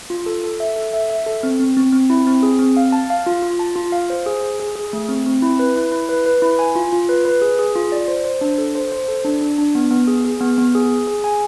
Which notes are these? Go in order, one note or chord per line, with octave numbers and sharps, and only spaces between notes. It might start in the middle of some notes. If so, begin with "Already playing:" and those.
F4
A4
A4
E5
A4
E5
E5
A4
C4
C4
C4
C4
E4
C4
G#4
C4
F5
A5
F5
F4
F4
A5
F4
F5
C5
G#4
G#4
G#4
G#4
A3
C4
C4
E4
B4
E4
E4
B4
B4
E4
G#5
F4
F4
B4
B4
G#4
G#4
F4
D5
C5
C5
D4
A4
C5
C5
A4
D4
D4
D4
B3
B3
G#4
G#4
B3
B3
G#4
G#4
G#4
G#5